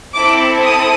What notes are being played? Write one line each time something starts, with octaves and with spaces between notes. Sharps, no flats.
C4 E4 A4 D6
D#6